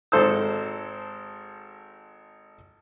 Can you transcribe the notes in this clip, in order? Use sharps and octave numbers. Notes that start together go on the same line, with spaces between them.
G#1 G#2 A4 C5 A5 E6